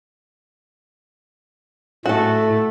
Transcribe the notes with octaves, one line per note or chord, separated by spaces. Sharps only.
A2 A3 F#4 A4